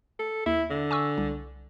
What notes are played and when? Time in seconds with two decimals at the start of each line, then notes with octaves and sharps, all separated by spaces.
0.19 A4
0.46 D#2 E4
0.70 D3
0.91 G#5 C#6 E6
1.18 C2